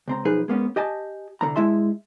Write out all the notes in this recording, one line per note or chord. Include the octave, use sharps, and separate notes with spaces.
C#2 C4 A#5
B1 F3 D#4 G#4 B4
G#3 A#3 B3 C#4
G4 D#5 G#5 A5
C2 D3 F#3 A#5
G2 G#3 E4 E5 A5 C6